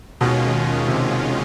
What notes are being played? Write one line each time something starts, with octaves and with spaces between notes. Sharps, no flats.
D#2 B2 D#3 G#3 C#4 F4
C3